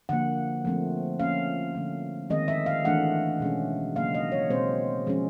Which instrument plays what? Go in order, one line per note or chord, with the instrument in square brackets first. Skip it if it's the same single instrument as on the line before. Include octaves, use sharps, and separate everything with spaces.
[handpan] D3 F3 A#3 F#5
F3 A3 C4
F3 A#3 C#4 F5
D3 F3 A3
D#3 G#3 C4 D#5
E5
F5
E3 A3 D4 F#5
B2 G#3 C#4
C#3 F#3 A#3 F5
D#5
C#5
B2 G#3 C4 C5
F3 G#3 C#4